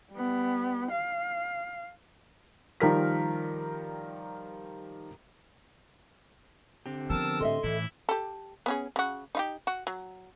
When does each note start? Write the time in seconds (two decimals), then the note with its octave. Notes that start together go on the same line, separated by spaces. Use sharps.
0.13 G3 B3
0.91 F5
2.80 D#3 F3 G3 A#4 F6 B6
6.86 D3 C4 G4
7.10 F3 B3 A#4 A5 E6
7.40 A2 A4 D#5 E5 C6
7.64 A2 E3 D#4 E4
8.09 G4 A4
8.66 B3 C#4 G#4
8.96 C#3 F#4
9.35 D#4 F4 G4
9.67 F#4
9.87 F#3